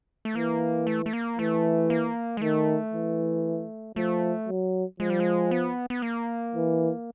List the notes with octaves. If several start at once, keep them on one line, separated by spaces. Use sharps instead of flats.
A3
E3 A#3
A3
A3
A#3
E3 A3
A#3
G#3
D#3 A3
E3
F3 A3
F#3
F3 G#3
G3
G#3
B3
B3
A#3
E3